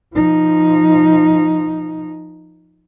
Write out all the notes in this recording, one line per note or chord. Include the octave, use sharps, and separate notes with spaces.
F3 D#4